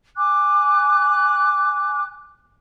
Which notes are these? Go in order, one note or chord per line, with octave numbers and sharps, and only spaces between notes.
G#5 D6 F#6